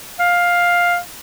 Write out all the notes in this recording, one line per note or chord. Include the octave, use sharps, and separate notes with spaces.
F5